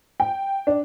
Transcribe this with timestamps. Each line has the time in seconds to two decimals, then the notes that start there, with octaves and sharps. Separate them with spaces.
0.20 G5
0.67 D4